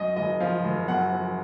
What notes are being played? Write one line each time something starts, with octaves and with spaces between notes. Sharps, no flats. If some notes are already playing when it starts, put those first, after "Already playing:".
Already playing: F#2 D#5
F#1 D#5
F3 F5
F#1
F#2 F#5
F3